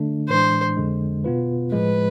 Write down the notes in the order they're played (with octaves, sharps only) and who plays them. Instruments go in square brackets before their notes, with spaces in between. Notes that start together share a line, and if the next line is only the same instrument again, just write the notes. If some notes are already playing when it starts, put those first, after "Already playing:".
Already playing: [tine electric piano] D3 A3 D4
[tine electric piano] A2 E3 G#3 D4 [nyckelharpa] C5
[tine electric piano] F2 D3 G#3
B2 B3 F4 B4
[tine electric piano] A2 F3 G#3 [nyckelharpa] B4